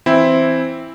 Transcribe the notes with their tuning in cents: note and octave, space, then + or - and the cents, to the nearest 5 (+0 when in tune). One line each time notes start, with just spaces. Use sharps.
E3 -5 C4 +0 E4 +0